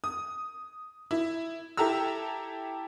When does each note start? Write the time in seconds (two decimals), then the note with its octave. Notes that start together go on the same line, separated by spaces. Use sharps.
0.04 D#6
1.11 E4
1.77 E4 G4 A4 A#5 E6